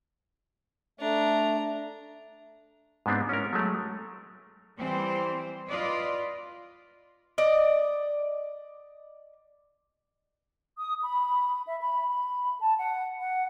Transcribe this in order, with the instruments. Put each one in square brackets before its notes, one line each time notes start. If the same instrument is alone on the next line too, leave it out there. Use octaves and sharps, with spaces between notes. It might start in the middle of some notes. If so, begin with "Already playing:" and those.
[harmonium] A3 [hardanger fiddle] D4 A#5
[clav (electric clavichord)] G#2 G#3 B3 C4 D4
C#4 E4 A#4
F#3 G#3 A3
[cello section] E3 G3 C4 C5
F4 B4 D5 D#5
[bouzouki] D5 D#5
[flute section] D#6
B5
E5
B5
B5
A5
F#5
F#5